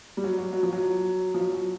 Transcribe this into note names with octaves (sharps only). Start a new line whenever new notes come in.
G3
F#3
F#3
F#3
F3
F#3
F3
F#3
F#3